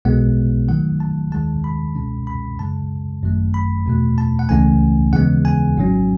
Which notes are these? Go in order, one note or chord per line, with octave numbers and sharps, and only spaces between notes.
B1 B2 G#3 B3 F#5
G#2 D#3 F#3 A3 F#5
A5
D#2 D#3 G#3 A5
B5
C#2 B2 G#3 C#4
B5
F#2 C#3 G#3 A5
G#1 F#2 D#3 A3
B5
E2 B2 A3
A5
F#5
C#2 C#3 E3 A3 C#4 G#5
D#2 C#3 E3 G#3 B3 F#5
G#5
G#1 G#2 F#3 C#4